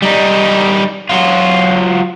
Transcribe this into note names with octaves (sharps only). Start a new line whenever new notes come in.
G3 D#4
F#3 F4